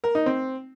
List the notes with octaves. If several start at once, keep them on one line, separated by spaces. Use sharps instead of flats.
A#4
D#4
C4